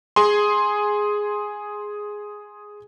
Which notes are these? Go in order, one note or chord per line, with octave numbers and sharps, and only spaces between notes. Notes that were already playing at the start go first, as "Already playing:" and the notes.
G#4 G#5 C6